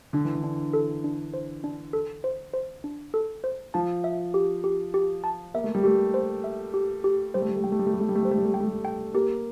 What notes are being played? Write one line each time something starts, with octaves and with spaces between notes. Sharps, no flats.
D3 D4
E3
D3
D4
A4
D4
C5
D4
A4
C5
C5
D4
A4
C5
F3 A5
E5
G4
G4
G4
A5
A#3 E5
A3
G3
A3 G4
C5
E5
G4
G4
G3 C5
A3
G3
A3
G3 G5
A3
G3
A3
G3 G4
A3
G3
A3
G3 C5
A3
G3
A3
G3 G5
A3
G3
G5
A#3 G4